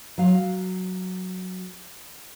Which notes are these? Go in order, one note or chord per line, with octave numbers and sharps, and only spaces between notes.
F#3 F5